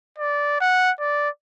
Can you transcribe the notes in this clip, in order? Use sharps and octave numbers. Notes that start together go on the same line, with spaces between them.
D5
F#5
D5